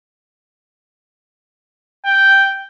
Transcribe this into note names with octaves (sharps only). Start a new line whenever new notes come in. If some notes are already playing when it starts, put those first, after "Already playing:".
G5